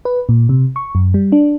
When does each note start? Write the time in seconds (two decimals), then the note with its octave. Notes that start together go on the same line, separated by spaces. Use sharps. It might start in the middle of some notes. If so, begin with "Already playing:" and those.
0.05 B4
0.29 A#2
0.49 C3
0.76 C#6
0.95 F#2
1.14 G3
1.32 D4